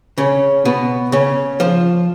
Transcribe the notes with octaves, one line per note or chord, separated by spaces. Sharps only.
C#3 C#4
B2 B3
C#3 C#4
F3 F4